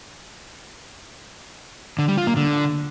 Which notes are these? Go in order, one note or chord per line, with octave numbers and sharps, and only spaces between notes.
D3
G3
F4
A#3
D3